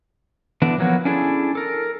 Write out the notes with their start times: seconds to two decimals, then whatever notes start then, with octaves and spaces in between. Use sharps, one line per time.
0.62 D3 E3 B3 D4
0.79 F3 F#3 A#3 B3 F#4
1.05 C#4 D4 E4 G#4 A4
1.55 A4 A#4